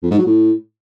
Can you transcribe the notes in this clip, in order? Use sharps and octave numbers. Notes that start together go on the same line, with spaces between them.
F2
G#2
F#3
A2